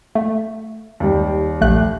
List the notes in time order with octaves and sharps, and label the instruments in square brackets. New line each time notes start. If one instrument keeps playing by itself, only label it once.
[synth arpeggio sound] A3
[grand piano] D#2 G3
[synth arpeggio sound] A#1 A3 F#6